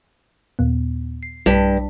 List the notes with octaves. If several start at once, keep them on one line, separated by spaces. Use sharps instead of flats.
D#2 A#2 B3
C7
B1 G2 G3 B6